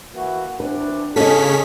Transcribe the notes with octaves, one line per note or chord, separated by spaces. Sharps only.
E3 A#3 F#4
E3 C4 D4 B4
C#3 C#4 G#4 A4 D#5 B6